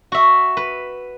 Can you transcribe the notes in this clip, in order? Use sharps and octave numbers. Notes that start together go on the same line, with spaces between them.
F#4 E5
B4